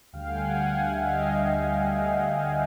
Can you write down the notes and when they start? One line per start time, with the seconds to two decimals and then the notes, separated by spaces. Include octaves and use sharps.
0.13 D2 D3 G3 F5 G5
0.28 F#5 G#5
0.44 F5 G5
0.60 F#5 G#5
0.90 E5 F#5
1.06 D#5 F5